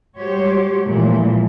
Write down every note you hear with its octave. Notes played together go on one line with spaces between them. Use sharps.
G3 G#3 F#4 G4 C5 C#5
A#2 E3 F3 G#3 A3